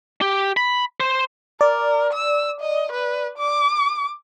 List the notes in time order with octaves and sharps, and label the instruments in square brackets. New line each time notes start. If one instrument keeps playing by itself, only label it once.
[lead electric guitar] G4
B5
C5
[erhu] A#4 [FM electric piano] D5
[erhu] E6
D#5
B4
D6